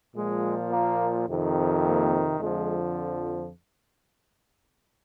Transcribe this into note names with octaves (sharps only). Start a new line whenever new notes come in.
A#2 F3 G#3
A#3
F2 C3 D#3
A#3
F2 D3 F3 G#3